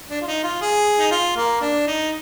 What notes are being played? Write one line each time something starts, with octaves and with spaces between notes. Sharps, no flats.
D4
F4
D#4
F4
G#4
D#4
F4
A#3
D4
D#4